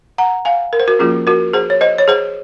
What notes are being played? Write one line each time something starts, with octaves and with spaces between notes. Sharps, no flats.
F#5 A#5
F5 G#5
A#4
C5
F#4 A#4
F3 A#3 C#4 F4 G#4
F#4 A#4
G#4 C5
C#5
C5 D#5
C#5
G#4 C5